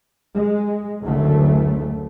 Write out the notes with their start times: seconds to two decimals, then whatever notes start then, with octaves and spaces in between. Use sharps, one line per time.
0.36 G#3
1.03 F#1 D2 A3